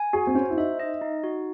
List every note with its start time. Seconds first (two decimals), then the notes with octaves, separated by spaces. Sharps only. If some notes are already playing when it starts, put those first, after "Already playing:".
Already playing: G#5
0.13 F#4 G#4
0.27 C4
0.35 C#4 C5
0.50 E4
0.57 D#4 E5
0.79 D#5
1.01 D#4
1.23 F#4